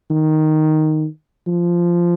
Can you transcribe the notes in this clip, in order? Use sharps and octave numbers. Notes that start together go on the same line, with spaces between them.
D#3
F3